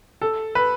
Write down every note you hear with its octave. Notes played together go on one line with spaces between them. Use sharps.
A4
B4